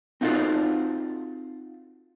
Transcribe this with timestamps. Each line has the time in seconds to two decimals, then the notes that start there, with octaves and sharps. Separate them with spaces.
0.21 C4 D#4 F4 F#4 A4 C5